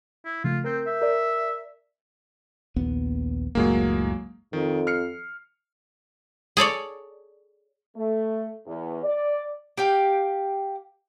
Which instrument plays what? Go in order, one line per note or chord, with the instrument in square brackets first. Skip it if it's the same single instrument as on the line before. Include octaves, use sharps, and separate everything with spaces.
[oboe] E4
[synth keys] C#3 F3 A3 [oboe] F4
[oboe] C4 [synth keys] A#4 G6
[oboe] E5
[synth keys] A#4 D5
[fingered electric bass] A#1 D#2 B3
[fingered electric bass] F#1 C#2 A2 [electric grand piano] F#3 G#3 A#3
[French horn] F2 [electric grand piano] D#3
[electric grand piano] F6 C7 C#7
[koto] G#4 A4 C#5 D5
[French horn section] A3
E2
D5
[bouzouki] G4 F5 G5